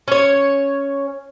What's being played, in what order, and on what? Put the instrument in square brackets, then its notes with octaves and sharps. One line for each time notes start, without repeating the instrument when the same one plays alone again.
[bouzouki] C#4 C#5